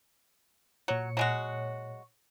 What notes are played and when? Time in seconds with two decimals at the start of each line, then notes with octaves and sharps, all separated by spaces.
0.88 A#2 F#3 C#5 C#7
1.17 F#3 G#3 F#4